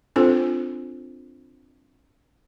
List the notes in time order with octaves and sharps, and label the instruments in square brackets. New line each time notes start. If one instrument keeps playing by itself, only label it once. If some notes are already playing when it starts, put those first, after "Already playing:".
[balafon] C4 D4 F4 A4 C5